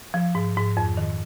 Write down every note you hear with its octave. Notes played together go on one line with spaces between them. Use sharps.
F3
G#2
G#2
F2
D#3